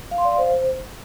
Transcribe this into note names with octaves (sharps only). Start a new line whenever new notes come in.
F5
C6
D5
F5
C5